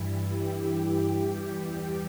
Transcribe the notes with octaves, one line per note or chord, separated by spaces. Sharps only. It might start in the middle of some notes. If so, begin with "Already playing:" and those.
Already playing: G2 E3 G3 E4
G4
E2 E3 G3